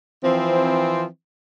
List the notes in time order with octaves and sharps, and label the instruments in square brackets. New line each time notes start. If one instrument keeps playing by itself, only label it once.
[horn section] E3 F3 C4